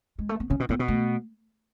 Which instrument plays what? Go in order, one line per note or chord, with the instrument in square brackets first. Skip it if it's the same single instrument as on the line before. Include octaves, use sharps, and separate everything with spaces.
[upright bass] G#3
A3
B3
[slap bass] C#3 [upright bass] C#4
[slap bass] B2
[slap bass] A2 [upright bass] B3
[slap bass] B2
[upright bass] A3